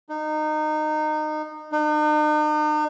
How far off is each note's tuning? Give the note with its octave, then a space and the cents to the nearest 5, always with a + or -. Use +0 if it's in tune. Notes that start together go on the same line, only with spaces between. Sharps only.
D#4 -25
D#4 -45